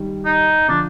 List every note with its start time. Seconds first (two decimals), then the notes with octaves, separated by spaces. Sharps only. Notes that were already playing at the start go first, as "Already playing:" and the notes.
Already playing: D#3 G3
0.25 D#4
0.68 D3 F3 D4